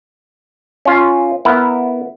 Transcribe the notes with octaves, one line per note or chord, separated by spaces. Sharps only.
C#4 F4
B3 E4 A#4